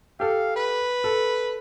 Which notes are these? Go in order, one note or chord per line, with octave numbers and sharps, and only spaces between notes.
G4 A4 F5
B4
A4